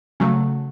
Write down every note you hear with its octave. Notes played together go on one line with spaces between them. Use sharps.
C#3 F#3 A3